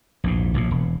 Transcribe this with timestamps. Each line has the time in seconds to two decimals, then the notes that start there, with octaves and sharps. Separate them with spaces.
0.24 A#1 E2 G#2
0.54 A#1 A2
0.71 E1